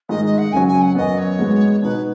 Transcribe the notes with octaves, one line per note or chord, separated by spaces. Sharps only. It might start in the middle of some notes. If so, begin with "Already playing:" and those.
G#2 D#3 G#3 D#4 D#5
D#5
F#5
F#2 C#3 F#3 G#5
G#5
F#5
F#2 F#3 B3 D#5
C#5
G#2 G#3 B3
B2 B3 D#4 F#4 B4